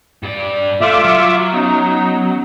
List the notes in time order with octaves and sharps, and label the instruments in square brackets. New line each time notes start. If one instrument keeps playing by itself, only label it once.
[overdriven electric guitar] G2 D5
[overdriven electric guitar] A3 [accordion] F4 E5 D6
[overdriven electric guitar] F#3
[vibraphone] B3 C#4 [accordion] D#4